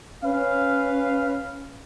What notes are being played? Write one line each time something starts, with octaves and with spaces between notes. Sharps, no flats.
C#4 B4 F5